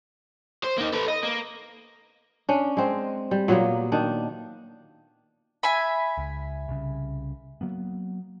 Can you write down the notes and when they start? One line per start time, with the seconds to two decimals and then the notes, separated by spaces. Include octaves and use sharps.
0.63 C5
0.78 A#3 D#4
0.93 A4 B4
1.08 D#5
1.23 A#3
2.49 C#4 D4
2.77 G#3 C4
3.31 G3
3.48 A#2 F#3 A#3 B3
3.92 D#3 D4
5.63 E5 G#5 B5
6.18 C#2
6.68 C2 C#3
7.61 F#3 A#3 B3